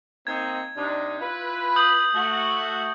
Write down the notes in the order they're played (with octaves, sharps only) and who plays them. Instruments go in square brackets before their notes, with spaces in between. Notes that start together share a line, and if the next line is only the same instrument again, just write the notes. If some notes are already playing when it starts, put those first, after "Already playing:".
[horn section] A#3 C4 D#4 [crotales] G#6
[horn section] C3 D4 D#4
E4 F4 B4
[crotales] D#6 G6 F#7
[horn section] A3 F#4